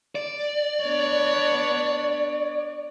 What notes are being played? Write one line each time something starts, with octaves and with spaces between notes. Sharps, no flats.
D5
B3 D4 C#5